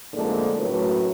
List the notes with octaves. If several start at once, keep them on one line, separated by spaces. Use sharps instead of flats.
F2 G#2 D3 A3 A#3 D4
F#2 A2 F#3 A3 B4 C#5